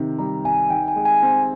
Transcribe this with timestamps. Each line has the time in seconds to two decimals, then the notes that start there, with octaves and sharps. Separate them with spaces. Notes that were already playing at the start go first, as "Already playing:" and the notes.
Already playing: C3 D#3
0.19 G3 A#5
0.44 C2 G#5
0.70 D#3 G5
0.88 G#5
0.96 G#3
1.05 G#5
1.22 C4